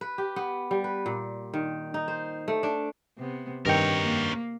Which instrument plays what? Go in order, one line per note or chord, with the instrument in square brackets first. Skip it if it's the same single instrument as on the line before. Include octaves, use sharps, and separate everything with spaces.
[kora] B4
G4
B3
G3
B4
A#2
D#3
D#4
C5
A3
D4
[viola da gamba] C3 B3
[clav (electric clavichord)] G2 D#3 G5 [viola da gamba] C4 [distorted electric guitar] A#4 C#5
[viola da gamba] A#3